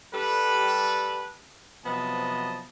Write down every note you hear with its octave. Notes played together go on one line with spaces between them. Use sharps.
G3 A4 B4
C3 F3 F#3 B3 D#5 A5